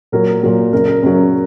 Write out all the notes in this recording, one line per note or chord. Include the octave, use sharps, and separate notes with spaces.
A#2 F#3 A#4
A#2 F#3
F#2 C#3 F#3 A#4
A#4
F#2 C#3 F#3